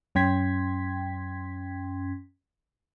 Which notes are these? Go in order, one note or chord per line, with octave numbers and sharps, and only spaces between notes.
F#2 C#4 G5 C6 G#6 B6